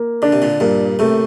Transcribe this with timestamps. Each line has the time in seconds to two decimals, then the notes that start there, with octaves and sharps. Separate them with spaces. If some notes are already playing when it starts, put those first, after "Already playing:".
Already playing: A#3
0.22 D3 D4
0.32 C3
0.42 A#2 D3
0.60 G2 A#2 A#3
0.99 A2 C3 A3